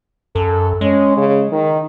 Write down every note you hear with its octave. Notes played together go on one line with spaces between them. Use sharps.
F#2 A4
G#3 C#4
C#3
D#3